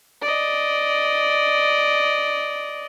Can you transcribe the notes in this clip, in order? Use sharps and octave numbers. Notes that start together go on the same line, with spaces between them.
D5 D#5